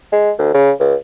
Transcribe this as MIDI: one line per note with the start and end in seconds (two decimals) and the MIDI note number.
0.12 0.31 56
0.39 0.50 38
0.54 0.72 49
0.80 0.95 37